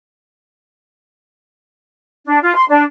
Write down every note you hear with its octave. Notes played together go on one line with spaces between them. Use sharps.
D4
F4
C6
D4